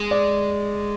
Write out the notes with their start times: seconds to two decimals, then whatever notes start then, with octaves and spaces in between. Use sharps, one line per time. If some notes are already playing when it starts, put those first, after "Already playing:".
Already playing: G#3
0.11 D5